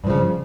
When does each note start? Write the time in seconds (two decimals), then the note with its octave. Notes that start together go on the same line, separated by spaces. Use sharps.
0.04 G2
0.07 F3
0.10 C#3